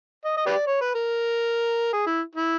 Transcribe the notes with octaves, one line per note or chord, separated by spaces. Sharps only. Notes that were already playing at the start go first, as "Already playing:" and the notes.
D#5
D#5
G4 B4 D5
C#5
B4
A#4
G#4
E4
E4